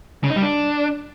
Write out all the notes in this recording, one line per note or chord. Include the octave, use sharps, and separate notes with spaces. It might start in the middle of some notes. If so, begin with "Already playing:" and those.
C#3
D#4
G3
D4